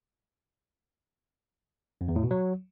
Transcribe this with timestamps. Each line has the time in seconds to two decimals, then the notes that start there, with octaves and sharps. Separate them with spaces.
2.01 F2
2.08 E2
2.16 A2
2.23 B2
2.31 F#3